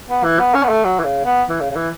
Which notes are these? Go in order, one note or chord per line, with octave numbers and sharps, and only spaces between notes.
B3
E3
B3
C#4
B3
A3
F#3
E3
C#3
B3
E3
C#3
C#3
E3